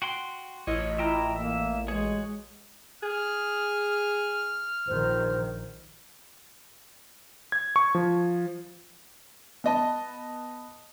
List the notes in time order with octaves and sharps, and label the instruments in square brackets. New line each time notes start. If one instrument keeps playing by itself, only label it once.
[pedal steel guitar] F#4 G5 C6
[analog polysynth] A1 [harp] E4 F4 D#5 [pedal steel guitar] C#5
[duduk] E4 [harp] F4 [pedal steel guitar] E5 G5 A#5
[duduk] A#3 [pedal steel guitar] E5
[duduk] G#3 [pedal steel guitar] F#4 G#4 C#5
[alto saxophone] G#4 [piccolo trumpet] F6
[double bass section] A#1 D#3 [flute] C5
[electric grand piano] G#6
C#6
F3
[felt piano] B3 D#5 A5